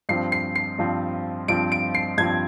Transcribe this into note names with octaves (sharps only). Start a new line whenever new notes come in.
G2 F3 C4 C7
C7
C7
G2 F3 C4
G2 F3 C4 D7
D7
C7
G2 F3 C4 G#6